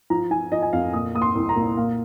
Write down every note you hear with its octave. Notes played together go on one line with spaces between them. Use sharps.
F3 A#5
F3 G#5
F3 D#5
G#5
F2 F5
A#2 D#6
A#3 D#6
C6
C2
A#5
A#2
A#2 F5